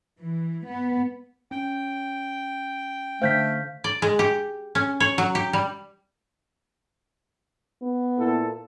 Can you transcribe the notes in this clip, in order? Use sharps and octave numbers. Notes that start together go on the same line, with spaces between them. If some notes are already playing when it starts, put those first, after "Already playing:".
E3
B3
C#4 G5
D3 A3 C5 F5 G6 B6
D5
G#3
G4
C#4
C#5
F#3
G4
G3
B3
A#2 E4 A4